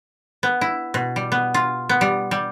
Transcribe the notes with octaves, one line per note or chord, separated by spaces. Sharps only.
B3
E4
B2
G3
B3
F4
B3
G3
G3